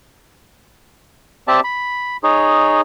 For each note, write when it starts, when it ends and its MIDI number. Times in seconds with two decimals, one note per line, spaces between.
1.48 1.60 60
1.48 1.60 67
1.48 1.60 74
1.48 1.60 76
1.48 1.60 81
1.64 2.17 83
2.23 2.81 63
2.23 2.81 68
2.23 2.81 73